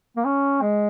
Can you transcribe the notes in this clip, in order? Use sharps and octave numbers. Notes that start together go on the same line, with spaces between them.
A#3
C#4
G#3